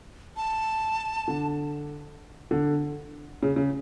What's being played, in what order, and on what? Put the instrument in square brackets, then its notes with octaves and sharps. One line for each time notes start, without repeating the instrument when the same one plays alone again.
[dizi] A5
[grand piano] D3
D3
C#3
C#3